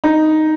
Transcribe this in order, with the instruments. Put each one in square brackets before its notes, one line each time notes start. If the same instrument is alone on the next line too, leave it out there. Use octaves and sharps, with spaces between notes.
[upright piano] D#4